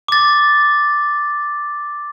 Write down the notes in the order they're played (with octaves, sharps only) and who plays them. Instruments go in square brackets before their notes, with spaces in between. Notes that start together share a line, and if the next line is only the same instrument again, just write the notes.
[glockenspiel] D6 A6